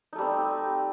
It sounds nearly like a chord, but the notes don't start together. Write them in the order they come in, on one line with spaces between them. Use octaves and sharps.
D#4 A3 G3 C4